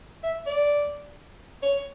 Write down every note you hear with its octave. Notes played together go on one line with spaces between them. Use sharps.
E5
D5
C#5